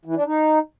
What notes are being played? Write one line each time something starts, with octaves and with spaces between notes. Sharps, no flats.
E3
D4
D#4